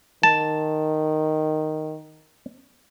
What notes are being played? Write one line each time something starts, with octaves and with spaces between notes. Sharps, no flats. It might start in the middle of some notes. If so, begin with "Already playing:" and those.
D#3 A5